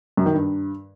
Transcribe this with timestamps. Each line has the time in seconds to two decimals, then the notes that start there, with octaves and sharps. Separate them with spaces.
0.17 F#2
0.26 D#3
0.34 G2